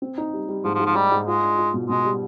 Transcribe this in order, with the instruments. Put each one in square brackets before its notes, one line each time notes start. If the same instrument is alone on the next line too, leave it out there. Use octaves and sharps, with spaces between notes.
[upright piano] C4
D#4
G3
G3
[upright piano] G#2 [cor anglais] F3
[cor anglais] F3
[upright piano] G#2
[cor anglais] F3
[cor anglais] G3 [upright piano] D#4
[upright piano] G#2
[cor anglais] G#3 [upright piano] F4
[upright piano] D4
F4
B2
[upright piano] B2 [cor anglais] G#3
[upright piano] G3